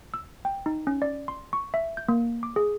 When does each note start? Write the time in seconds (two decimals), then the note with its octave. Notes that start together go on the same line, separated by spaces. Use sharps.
0.14 E6
0.45 G5
0.66 D#4
0.87 C#4
1.02 D5
1.28 C6
1.53 C#6
1.74 E5
1.97 G6
2.09 A#3
2.43 D6
2.56 G#4